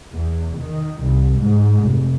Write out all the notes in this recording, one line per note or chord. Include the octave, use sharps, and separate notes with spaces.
E2
D#3
C2
G#2
F1